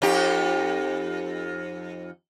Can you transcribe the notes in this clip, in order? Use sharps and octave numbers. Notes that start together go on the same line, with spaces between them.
F2 D#4 G4